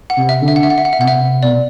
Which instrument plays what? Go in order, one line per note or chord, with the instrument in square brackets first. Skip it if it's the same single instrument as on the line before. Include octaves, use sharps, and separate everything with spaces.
[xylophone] F#5
[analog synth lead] C3
[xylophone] E5
[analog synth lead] D3
[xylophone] E5
F#5
E5
F#5
E5
F#5
E5
[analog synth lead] B2 [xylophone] F#5
[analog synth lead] C3 [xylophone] E5
[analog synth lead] B2 [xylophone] D5